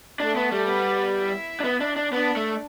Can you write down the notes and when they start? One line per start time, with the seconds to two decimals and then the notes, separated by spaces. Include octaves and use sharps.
0.20 A3 D4 A4
0.36 B3
0.52 G3
0.68 B3 B4
1.16 E4 E5
1.60 D4
1.64 B3
1.81 D4
1.96 D4
2.12 B3 D4 D5
2.37 A3